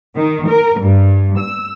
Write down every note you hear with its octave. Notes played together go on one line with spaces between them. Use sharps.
D#3
A#4
G2
E6